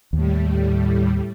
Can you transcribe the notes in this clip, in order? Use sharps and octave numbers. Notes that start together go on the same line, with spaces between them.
D#2 A2 G3